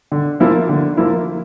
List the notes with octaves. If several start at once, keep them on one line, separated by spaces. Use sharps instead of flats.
D3
F3 A#3 E4
D3
F3 A#3 E4